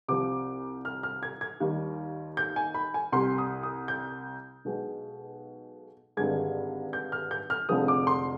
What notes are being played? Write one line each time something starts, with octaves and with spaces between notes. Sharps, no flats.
C2 C3 F3 D6
F6
F6
G#6
G#6
D#2 D#3 G3
G6
G#5
B5
G#5
C2 C3 G3 C6
D#6
D#6
G6
B1 B2 G#3
G#1 G2 D3 G#3 G#6
G6
F6
G6
F6
F1 F2 D3 F3 G#3 D#6
D6
C6